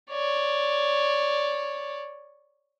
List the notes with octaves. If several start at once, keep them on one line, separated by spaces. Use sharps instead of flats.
C#5 D5